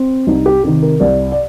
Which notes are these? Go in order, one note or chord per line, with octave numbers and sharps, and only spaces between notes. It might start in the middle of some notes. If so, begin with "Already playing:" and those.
Already playing: C4
C2 D#4
G4
C3 D#3 G4
A#4
C2 D5
D5